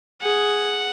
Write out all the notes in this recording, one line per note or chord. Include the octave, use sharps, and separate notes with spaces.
G#4 F#5